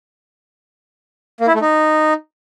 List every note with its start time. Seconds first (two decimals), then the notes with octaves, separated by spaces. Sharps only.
1.40 A#3
1.47 E4
1.54 A3
1.61 D#4